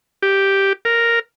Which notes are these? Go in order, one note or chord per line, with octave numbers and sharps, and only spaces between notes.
G4
A#4